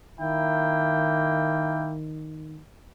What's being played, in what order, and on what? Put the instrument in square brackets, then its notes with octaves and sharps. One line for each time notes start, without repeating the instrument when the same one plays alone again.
[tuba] D#3 [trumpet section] A#3 E4 G5